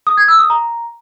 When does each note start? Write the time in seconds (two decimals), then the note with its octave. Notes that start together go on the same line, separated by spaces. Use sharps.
0.07 D#6
0.17 G#6
0.28 E6
0.39 D#6
0.50 A#5